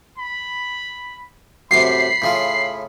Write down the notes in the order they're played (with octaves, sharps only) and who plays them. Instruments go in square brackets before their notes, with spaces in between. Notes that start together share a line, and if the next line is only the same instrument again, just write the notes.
[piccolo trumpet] B5
[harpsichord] F#2 A2 C3 [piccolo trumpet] B5 [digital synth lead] C7
[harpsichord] A2 C#3 F4